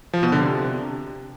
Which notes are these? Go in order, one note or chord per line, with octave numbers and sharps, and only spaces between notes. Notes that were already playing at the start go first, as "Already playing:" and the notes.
F3
B2
D3
C3